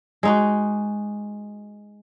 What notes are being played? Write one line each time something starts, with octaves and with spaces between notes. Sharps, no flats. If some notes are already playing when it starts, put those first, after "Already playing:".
G#3 D#4 F#4